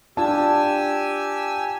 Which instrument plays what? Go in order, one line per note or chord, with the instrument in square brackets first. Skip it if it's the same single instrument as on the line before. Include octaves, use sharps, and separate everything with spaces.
[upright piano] D4 F4 A5 [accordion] G4 G#5 E6